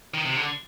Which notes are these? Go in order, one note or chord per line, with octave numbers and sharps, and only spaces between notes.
D#3
C3
D3